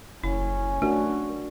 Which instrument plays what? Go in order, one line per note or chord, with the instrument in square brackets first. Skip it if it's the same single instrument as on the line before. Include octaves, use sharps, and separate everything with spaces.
[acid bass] F#1 [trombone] C#4 [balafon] E4
[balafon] A3 [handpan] D4 F#4 [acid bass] A#4